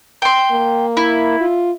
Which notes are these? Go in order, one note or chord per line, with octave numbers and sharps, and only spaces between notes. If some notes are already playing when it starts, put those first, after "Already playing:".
G5 C6
A#3
E4
F4